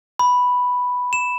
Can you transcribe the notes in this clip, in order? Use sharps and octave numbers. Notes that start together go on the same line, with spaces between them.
B5
E7